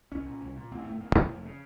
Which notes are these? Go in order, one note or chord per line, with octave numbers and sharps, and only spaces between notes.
C2 C#4
A#2
C2
A#2
A1 C4
A2
A3
A1 A#3
A2
F1
C#3